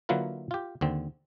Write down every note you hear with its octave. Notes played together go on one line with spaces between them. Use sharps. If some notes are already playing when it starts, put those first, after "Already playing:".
D3 F#3 A#3 E4 F4 B4
F4 G4
D#2 D3 C4